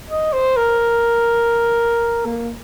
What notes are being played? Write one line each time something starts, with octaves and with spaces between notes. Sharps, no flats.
D#5
C5
A#4
A#3